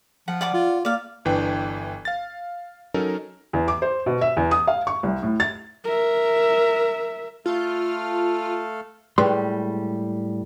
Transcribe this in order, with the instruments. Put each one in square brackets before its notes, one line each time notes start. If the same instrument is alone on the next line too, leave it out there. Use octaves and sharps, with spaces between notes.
[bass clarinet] F3 [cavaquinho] F#5
[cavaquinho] D5 F#5 D6
[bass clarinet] F4
[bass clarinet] A#3 [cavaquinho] D5 F5
[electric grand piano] G1 E3 D4 B4 G5
F5 A6
F#3 C#4 D#4 A4 A#4
[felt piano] E2
D6
C5
B2
E5
E2
D#6
F5
C#6
C2
A2
A6
[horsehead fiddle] A#4 E5
[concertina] A3 A4 F5 [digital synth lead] F4
[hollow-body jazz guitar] A2 G3 G#3 B4 C6